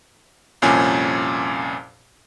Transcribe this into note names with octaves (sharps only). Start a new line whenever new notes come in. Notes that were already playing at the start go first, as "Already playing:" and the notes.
C2 F2 A#2 C#4 G#5